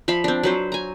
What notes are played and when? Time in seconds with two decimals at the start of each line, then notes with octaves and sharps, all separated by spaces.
0.08 F3 E5 F5 B5
0.24 C4 D4
0.43 F#3 B4 C5
0.72 G#5 A#5